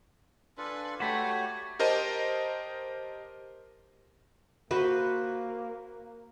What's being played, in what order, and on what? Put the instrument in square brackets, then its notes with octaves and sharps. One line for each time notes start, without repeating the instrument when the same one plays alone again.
[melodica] D4 F4 A4 [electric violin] B4 G#5
[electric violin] A3 [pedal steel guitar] F#4 B5 [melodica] G4 C#5
[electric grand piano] G4 A#4 C5 D#5 A5
[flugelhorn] A#3 [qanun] F#4 B4 C5